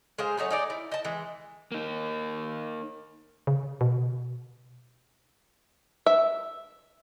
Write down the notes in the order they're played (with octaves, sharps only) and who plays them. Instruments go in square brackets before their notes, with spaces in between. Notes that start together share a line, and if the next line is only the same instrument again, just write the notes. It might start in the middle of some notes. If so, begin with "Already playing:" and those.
[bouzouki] G#3 G#4 C5 F5
F#3 A3 D#4 C#5
D#4 G#4 D5
E4
D#5 A5
E3 G#3
[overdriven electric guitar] A#3 D#4
[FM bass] C#3
B2
[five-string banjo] E5